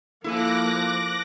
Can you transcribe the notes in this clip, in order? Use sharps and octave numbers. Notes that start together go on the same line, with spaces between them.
F3 A#3 E4 A4 G#5 D6 F#6 A#6